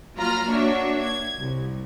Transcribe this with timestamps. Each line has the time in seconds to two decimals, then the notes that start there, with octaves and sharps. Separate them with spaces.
0.16 F#3 A#3 F4 A#5 B5 F6
0.48 A#3 D4 F#4 C#5 E5
1.02 G#6
1.38 C2